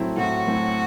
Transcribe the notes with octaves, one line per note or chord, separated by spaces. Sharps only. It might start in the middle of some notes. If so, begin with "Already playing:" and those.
Already playing: A2 F#3 A3 C4 E4
A2 F#4
F#3 A3 C4 E4